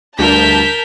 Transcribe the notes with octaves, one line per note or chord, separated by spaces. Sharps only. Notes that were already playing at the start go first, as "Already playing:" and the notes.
D2 G2 A#4 A5 G6 B6